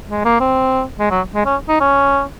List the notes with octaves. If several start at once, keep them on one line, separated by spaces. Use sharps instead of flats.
G#3
A#3
C4
G#3
F#3
G#3
C#4
D#4
C#4